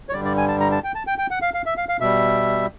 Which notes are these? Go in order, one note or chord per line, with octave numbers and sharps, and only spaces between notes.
C#5
G2 D3 G3 D5
D5
G#5
A5
A#5
A5
G5
A5
G5
G5
F#5
F5
F5
E5
F5
F5
B2 G3 E5